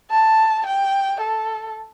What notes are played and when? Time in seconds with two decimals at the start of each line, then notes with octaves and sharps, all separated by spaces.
0.11 A5
0.66 G5
1.21 A4